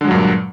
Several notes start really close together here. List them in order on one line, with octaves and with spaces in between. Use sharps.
D3 G#3 F#3 G2 A#2